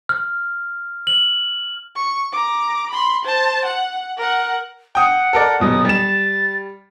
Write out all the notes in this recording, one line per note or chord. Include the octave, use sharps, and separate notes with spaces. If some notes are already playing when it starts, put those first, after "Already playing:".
F6
F#7
C#6
A#5 D6
B5 C6
C5 A5
F#5
A#4 F#5
F#5 G5 D#6
A4 A#4 D5
D#1 B2 F#3 D#6
G3 A6 E7